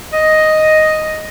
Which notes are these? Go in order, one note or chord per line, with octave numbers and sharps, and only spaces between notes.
D#5